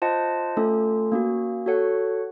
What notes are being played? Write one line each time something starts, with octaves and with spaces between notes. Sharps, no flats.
F4 C5 D#5 F#5 A5
A3 C#4 F4 A4
A#3 C#4 F#4
F#4 A4 C#5 F#5